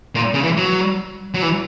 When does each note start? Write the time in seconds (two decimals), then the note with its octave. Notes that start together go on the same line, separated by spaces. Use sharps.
0.15 A#2
0.34 C#3
0.43 E3
0.57 F#3
1.34 F#3
1.42 E3